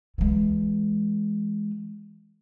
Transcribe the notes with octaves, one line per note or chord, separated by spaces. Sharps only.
E3 G#3